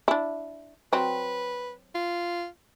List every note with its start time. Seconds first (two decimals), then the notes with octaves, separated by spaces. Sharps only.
0.08 D4 E4
0.93 F#3 C4 B4
1.95 F4